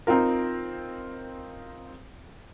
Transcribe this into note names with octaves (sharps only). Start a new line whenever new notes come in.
C4 D#4 F4 A#4